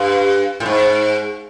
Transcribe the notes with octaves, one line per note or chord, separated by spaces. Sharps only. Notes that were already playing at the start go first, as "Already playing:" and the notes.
Already playing: G2
A2
G#2